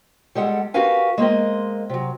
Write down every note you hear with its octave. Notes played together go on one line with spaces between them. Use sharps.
G3 G#3 A4 F#5
F#4 G4 A#4 B4 F5 G#5
G#3 A#3 C4 D#5
C3 F#3